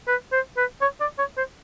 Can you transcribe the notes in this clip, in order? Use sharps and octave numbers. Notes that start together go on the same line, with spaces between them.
B4
C5
B4
C#5
D5
C#5
C5